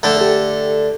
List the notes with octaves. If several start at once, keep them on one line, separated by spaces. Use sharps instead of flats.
D3 A3
G4 A4